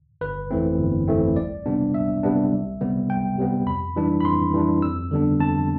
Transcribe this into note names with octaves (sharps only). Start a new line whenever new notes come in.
G1 B4
F2 E3 A3 C4
G1
F2 E3 A3 C4
C2 D5
C3 G3 B3 D4
C2 E5
C3 G3 B3 D4
C2
C3 G3 B3
C2 G5
C3 G3 B3
F2 B5
E3 G3 D4
B5
F2 C6
E3 G3 D4
F2 E6
D3 G3 B3 D4
F2 A5